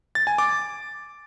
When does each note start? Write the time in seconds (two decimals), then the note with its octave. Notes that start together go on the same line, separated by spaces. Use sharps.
0.15 A6
0.27 G#5
0.38 D6